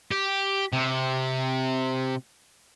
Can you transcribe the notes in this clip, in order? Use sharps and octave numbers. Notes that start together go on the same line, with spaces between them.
G4
C3